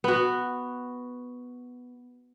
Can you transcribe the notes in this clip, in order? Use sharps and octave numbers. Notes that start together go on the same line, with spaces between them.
B3 F#4